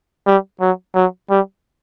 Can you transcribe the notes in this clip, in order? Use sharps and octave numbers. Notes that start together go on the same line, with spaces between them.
G3
F#3
F#3
G3